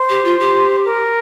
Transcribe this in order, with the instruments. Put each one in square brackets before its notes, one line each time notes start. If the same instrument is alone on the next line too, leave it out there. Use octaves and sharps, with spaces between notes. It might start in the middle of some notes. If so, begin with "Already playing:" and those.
Already playing: [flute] C5
[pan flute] G4
F4
G4
[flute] A#4